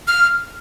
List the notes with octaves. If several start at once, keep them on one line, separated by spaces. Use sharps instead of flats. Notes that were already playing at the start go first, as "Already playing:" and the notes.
F6